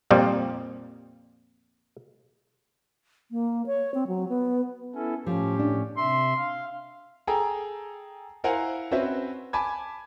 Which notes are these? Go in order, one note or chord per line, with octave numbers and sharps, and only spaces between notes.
F2 A#2 F3 G3
A#3
C#5
C4
F#3
B3
B3 C#4 E4 A4
A2 F3 C#4 G4
D4
C3 E5 C6
F5
G#4 A4 G5 G#5 A#5
E4 A#4 C5 F5 F#5 G#5
C4 C#4 F#4 B4 C5 E5
G#5 A5 B5 D6 G#6